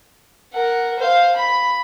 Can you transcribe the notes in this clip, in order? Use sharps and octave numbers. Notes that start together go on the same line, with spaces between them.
A#4 F#5
C5 F5
B5